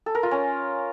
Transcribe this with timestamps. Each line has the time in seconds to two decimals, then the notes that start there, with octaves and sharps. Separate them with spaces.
0.06 A4
0.15 A#4
0.23 F4
0.31 C#4